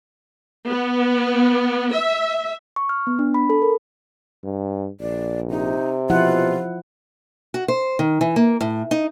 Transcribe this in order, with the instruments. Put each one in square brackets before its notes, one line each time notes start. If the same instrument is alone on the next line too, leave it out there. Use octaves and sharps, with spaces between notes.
[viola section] B3
E5
[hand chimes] C#6
F6
B3
D4
B5
A4
A#4
[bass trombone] G2
[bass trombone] A#1 [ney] D5
[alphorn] C3 [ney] D#4
[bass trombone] B2 [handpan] F3 E4 F#5 [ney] F4
[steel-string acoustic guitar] F#4
C5
D#3
E3
A#3
A2
D#4